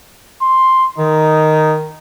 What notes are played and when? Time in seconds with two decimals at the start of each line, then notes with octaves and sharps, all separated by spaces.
0.42 C6
0.98 D#3 D#4